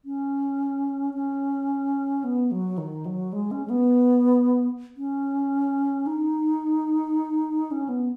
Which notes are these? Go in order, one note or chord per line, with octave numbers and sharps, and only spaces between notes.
C#4
C#4
B3
F#3
D#3
F#3
G#3
C#4
G#3
B3
C#4
D#4
C#4
B3